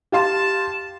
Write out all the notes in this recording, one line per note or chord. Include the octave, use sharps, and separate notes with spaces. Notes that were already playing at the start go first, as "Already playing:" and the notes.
G4 F5 A5 C6